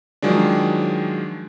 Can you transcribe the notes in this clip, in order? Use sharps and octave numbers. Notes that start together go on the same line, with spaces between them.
D#3 F3 F#3 G#3 D4